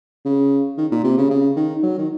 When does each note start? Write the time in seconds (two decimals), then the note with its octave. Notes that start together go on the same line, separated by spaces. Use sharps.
0.25 C#3
0.78 D#3
0.92 A#2
1.04 C3
1.18 C#3
1.31 C#3
1.57 D#3
1.83 F#3
1.98 D#3